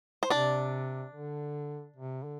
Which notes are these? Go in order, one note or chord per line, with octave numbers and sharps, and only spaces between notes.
C5
C3 D4 D5
D3
C3
D3